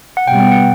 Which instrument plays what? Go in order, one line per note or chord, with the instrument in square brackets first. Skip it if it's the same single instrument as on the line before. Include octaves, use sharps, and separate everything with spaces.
[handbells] F#5
[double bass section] B2 G3 B3 [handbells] G5
[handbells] G5
F#5